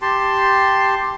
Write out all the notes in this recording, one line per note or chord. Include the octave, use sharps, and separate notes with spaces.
G4 A5 C6